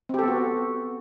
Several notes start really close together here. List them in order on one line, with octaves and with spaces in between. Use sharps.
C4 G4 A4 B3 F#4